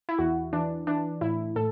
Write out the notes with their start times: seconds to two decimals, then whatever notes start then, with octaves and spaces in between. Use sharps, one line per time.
0.09 E4
0.19 E2 F#4
0.53 E3 D4
0.87 E3 D4
1.21 A2 E4
1.56 A2 A4